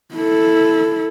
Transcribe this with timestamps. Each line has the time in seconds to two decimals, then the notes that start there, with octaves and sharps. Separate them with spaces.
0.15 E4 A4